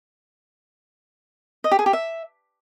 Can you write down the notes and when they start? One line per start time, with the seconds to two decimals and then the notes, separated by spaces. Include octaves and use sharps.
1.64 D#5
1.71 G4
1.79 G#4
1.86 G4
1.93 E5